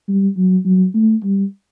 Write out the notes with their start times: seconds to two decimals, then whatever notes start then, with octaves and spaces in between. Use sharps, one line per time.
0.08 G3
0.37 F#3
0.65 F#3
0.94 A3
1.24 G3